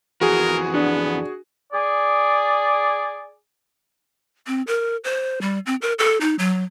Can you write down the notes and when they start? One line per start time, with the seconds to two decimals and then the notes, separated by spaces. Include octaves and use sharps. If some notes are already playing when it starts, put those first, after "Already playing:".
0.21 F2 E3 F#4 G#4 A#4
0.74 B3 D4
1.72 G#4 D5
4.47 C4
4.67 A#4
5.04 C5
5.41 G3
5.66 C4
5.82 A#4
5.99 A4
6.21 D#4
6.39 F#3